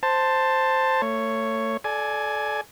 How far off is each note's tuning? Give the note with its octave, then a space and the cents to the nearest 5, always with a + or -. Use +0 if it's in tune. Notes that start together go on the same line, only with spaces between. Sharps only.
C5 +0 A5 +10
A3 +35 C#5 +0
A4 -25 D5 +0 G#5 +10